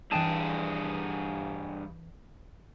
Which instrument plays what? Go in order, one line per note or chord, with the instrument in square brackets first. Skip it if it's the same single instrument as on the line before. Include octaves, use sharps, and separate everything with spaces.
[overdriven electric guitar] G2 G#4 [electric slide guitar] E3 G5 A5